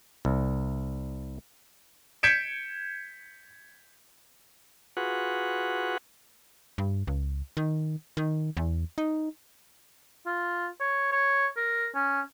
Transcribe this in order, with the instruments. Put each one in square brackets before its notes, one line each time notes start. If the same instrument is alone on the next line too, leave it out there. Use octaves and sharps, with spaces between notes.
[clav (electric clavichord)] C2
[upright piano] G6 G#6 B6 C#7 D7 E7
[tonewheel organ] F4 F#4 G#4 B4 F#5
[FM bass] G2
C#2
D#3
D#3
E2
D#4
[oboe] F4
C#5
C#5
A#4
C#4